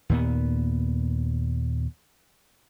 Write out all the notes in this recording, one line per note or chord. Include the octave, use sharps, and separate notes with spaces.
D#2 A#2 B3